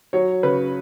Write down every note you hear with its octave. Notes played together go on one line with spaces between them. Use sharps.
F#3 C#5
C#3 B4